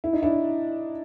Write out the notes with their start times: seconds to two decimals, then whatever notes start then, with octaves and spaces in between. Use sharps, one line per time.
0.04 E4
0.13 D#4
0.23 D4 E4